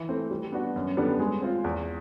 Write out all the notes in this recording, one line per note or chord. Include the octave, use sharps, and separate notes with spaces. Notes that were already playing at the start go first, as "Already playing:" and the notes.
Already playing: E3
A3 C4
G3
B3 D4 F#4
F#2
D3 G3 B3 D4
G#3
C4 F4
E2